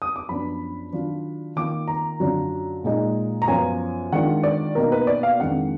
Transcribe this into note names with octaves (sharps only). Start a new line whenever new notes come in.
D#6
D6
F#2 F3 B3 D4 B5
D#3 F#3 D4 F4
D#3 A#3 F4 D6
A#5
F#2 D3 F#3 D4 F4
A#2 G#3 D#4
A#5
F#2 F3 B3 F4 G#5
D#3 G#3 D4 F4 F#5
D5
B2 A#3 D#4 A#4
B4
D5
F5
F2 D#3 G#3 D4 F#5